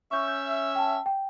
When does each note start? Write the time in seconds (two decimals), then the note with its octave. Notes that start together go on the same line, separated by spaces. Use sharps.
0.11 C#4 E5 C#6 G6
0.28 G6
0.75 G5 A5
1.06 G5